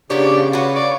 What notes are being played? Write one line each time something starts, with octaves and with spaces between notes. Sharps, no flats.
C#3 F3 A#3 B3 D4 G4 C#5 D5
F4 F#4 B4 C#5
D5